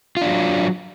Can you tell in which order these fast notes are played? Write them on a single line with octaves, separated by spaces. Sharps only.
F4 D4 F#3